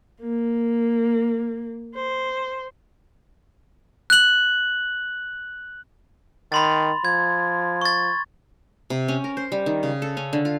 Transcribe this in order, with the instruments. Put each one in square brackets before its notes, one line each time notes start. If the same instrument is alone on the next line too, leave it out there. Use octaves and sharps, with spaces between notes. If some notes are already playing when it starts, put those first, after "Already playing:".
[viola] A#3
C5
[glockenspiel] F#6 F#7
[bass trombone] D#3 [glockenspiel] B5 C6 A6
[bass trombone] F3 [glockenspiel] G#6
[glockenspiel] C#6 A6
[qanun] C3
C#4
A#4
C5
G3
D#3
C#3
A4
C#4
D3
F4